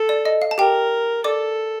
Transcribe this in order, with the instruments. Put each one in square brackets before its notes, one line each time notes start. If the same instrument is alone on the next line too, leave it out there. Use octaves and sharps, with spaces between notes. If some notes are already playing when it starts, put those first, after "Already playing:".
Already playing: [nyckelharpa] A4
[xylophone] D5
D#5
F5
A5
[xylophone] G4 G5 [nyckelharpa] A#4
[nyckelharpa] A4 [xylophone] D5 D6